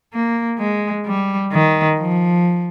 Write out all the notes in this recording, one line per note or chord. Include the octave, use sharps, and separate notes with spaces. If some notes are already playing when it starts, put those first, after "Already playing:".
A#3
G#3
G3
D#3
F3